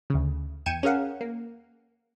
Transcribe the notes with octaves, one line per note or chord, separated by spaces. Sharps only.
D2 C#3
E2 G5 G#6 C#7 D#7 E7
C#4 G#4 A#4 F5 F#5
A#3